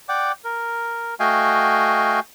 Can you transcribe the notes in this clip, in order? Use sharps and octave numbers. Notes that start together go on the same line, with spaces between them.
D5 F#5 G5 D6
A#4
A3 F#4 D#5 F5 G5 G#5